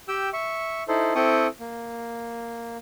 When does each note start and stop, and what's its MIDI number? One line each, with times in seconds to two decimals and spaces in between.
0.08 0.29 67
0.08 0.29 79
0.08 0.29 88
0.33 0.83 76
0.33 0.83 85
0.88 1.14 63
0.88 1.14 64
0.88 1.14 69
0.88 1.14 72
1.15 1.47 60
1.15 1.47 64
1.15 1.47 69
1.15 1.47 79
1.15 1.47 85
1.15 1.47 87
1.60 2.77 58